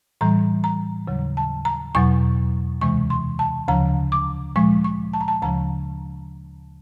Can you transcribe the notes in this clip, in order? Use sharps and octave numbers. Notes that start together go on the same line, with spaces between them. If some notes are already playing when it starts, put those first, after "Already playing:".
A2 E3 G3 A#5
A#5
D#2 C#3 F#3
A5
A#5
E2 B2 F#3 C#6
D2 C3 E3 G#3 C#6
C6
A5
D2 C#3 F3 A#5
D6
A#2 F3 G#3 C#6
C#6
A5
A#5
A5
D2 C#3 F3 A#5